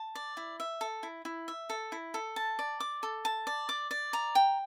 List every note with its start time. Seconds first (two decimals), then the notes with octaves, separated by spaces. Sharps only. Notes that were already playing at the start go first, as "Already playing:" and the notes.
Already playing: A5
0.15 D5
0.37 E4
0.60 E5
0.81 A4
1.03 E4
1.25 E4
1.48 E5
1.70 A4
1.92 E4
2.14 A4
2.36 A5
2.59 D5
2.80 D6
3.03 A4
3.25 A5
3.47 D5
3.69 D6
3.91 D5
4.13 A#5
4.35 G5